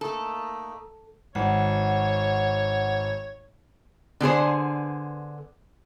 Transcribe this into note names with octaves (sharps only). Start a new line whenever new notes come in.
A3 A#3 D#4 A4
G#1 C#5 F#5
D3 B3 G#4 C5